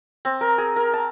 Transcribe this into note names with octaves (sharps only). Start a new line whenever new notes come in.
C4
A#4
G#4
A#4
A5